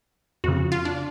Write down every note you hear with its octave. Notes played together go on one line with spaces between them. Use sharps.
F2 C#3 F#4
F4
D4